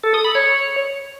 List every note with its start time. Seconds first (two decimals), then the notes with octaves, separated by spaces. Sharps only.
0.04 A4
0.14 D#6
0.25 B5
0.35 C#5